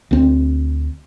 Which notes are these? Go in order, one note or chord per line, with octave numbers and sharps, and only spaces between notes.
D2 C4